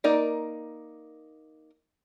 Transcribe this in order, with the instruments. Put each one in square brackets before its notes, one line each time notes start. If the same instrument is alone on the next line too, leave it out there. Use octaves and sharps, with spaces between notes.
[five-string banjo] A#3 D#4 A#4 D5